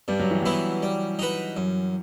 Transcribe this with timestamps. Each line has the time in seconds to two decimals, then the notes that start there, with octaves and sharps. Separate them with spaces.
0.08 G2 G3
0.20 F#3
0.31 E3
0.42 E3 F#3 B3 E4
0.83 G3
1.19 D#4 F#4 B4
1.57 F#2